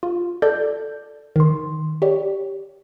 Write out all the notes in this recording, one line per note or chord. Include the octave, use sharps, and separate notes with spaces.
F4
A4 D5 G6
D#3 C6
G4 C#5 D5